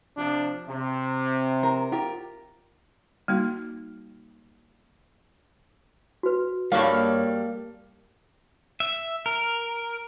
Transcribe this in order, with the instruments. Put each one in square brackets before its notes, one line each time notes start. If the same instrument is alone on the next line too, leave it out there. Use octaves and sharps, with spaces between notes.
[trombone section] C3 F3 D4
C3
[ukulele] A#4
F4 G4 A#4
[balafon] G3 A#3 D#4 F#4
[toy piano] F#4 B4
[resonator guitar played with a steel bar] G2 C#5 F5 [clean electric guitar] G3 A4 [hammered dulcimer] A#3
[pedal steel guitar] E5
A#4